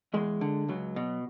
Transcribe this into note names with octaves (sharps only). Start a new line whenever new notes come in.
E2 G#3
D3
C#2 F#3
B2